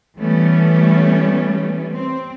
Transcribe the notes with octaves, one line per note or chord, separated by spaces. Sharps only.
E3 G3 A3 B3 C#4
C4